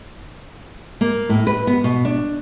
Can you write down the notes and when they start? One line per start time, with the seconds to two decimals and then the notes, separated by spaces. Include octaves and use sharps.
1.01 A#3
1.29 A2
1.47 B4
1.67 B3
1.84 B2
2.05 D4